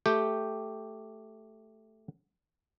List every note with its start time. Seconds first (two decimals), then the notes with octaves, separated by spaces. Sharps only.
0.06 A3 G4 G5